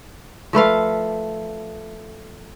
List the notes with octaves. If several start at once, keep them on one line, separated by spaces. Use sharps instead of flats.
F3 A3 B4 F5